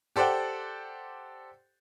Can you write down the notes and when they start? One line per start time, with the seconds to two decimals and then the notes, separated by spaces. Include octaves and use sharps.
0.16 G4 A4 C5 D5 F#5 G5